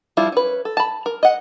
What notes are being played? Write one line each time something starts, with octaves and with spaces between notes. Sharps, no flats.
F3 G3 E4 F4
C#4 B4
A4
A5 B5
A#4
D#5 F#5